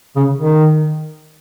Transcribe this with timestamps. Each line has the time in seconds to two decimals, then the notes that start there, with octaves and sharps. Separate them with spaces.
0.16 C#3
0.38 D#3